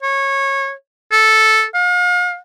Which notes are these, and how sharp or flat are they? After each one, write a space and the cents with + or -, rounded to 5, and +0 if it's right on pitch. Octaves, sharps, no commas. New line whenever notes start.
C#5 -20
A4 -5
F5 +40